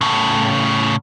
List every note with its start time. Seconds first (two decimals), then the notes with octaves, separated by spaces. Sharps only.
0.01 A2 C#3